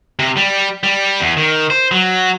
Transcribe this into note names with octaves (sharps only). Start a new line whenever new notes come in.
C3
G3
G3
E2
D#3
C5
F#3